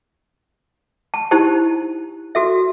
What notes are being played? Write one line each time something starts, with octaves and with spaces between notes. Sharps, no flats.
A5
D#4 E4 G4 C5 A5
F#4 A4 E5